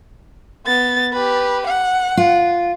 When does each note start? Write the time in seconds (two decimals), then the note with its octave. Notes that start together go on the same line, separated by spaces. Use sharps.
0.66 B3 A6
1.12 G4 B4
1.67 F#5
2.17 F4